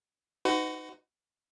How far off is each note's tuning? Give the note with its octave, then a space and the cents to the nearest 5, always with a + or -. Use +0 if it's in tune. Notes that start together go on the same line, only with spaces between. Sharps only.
D#4 +0 F#4 +5 B4 +40